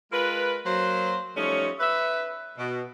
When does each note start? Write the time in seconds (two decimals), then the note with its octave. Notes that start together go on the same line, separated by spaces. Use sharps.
0.12 G#3 F4 A#4 B4
0.65 F#3 A#3 C5
1.37 F3 G3 A3 C#4 D#4 C#5
1.80 B4 E5
2.58 B2